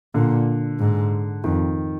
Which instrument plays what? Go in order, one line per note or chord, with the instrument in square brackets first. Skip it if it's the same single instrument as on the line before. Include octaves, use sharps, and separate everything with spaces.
[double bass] A#2 [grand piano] D3
[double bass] G#2
[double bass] F2 [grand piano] D#3